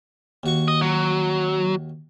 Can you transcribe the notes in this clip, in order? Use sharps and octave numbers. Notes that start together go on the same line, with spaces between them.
D#2 F#4 C#6
D#5
F#3